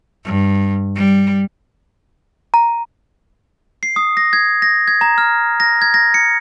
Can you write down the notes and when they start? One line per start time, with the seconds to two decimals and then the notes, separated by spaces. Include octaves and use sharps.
0.25 G2
0.96 G3
2.54 A#5
3.83 C7
3.96 D#6
4.17 A#6
4.33 G#6
4.62 A#6
4.88 G#6
5.01 A#5
5.18 F6
5.60 A#6
5.82 G#6
5.94 A#6
6.14 C#7